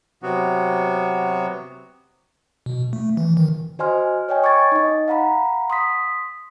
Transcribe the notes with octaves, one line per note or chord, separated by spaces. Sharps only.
C3 F#3 B3 F#4
B2
A3
E3
D#3
F#4 C5 D#5 G#5 C6 F6
C#5 D#5 G5 G#5
C#6 D6 G#6 A6
D#4 D#5
F5 F#5 A#5 B5
C6 D#6 B6